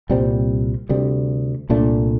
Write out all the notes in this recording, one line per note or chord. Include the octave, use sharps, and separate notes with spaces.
C2 A#2 G3 C4
D2 C3 G3
C2 A#2 A3 D4